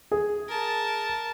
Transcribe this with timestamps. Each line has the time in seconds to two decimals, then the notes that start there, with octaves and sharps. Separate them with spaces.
0.12 G#4
0.48 A#4 A5